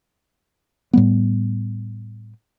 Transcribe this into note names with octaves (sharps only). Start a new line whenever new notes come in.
A2 G3 B3